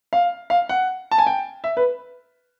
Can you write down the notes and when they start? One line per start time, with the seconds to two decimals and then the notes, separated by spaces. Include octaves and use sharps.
0.13 F5
0.50 F5
0.69 F#5
1.11 A5
1.18 G#5
1.27 G5
1.64 E5
1.77 B4